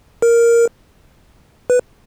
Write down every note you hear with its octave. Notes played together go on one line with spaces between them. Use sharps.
A#4
B4